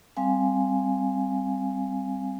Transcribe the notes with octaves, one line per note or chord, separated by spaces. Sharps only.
G3 C4 F5 G#5